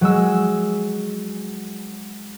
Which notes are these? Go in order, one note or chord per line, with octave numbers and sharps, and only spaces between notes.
F#3 G#3 E6